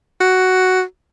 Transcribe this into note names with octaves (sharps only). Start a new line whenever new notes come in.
F#4